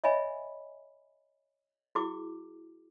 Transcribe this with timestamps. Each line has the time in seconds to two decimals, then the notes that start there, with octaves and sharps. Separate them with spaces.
0.04 C#5 D#5 E5 G#5 B5
1.95 E4 F#4 G#4 D6